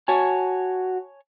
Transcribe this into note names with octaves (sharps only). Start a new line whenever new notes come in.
F#4 C#5 G#5 A5